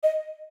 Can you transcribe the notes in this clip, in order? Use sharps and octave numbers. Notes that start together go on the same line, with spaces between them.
D#5